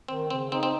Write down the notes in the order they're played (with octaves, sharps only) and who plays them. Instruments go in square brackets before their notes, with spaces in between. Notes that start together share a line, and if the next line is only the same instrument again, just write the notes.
[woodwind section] D#3 [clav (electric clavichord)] C4
[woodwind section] C#3 [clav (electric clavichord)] C4
[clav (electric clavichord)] C4 [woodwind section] D#4
[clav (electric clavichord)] C4